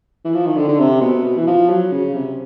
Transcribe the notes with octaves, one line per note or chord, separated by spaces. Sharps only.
E3
F3
D#3
D3
D3
C3
B2
B2
E3
F3
F#3
C#3
C3